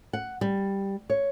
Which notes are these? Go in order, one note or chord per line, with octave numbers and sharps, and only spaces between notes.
F#5
G3
C#5